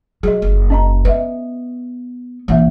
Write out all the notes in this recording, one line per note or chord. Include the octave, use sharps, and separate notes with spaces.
F#3 G#4 D#5
F#1
C#4 D#5 A#5
B3 B4 D#5 E5
A#1 E3 A#3 E5